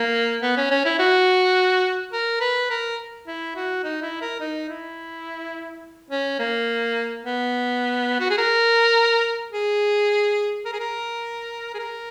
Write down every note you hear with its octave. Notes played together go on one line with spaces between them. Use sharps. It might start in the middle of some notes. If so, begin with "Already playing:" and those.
Already playing: A#3
B3
C#4
C#4
E4
F#4
A#4
B4
A#4
E4
F#4
D#4
E4
A#4
D#4
E4
C#4
A#3
B3
F#4
G#4
A#4
G#4
A#4
G#4
A#4
G#4
A#4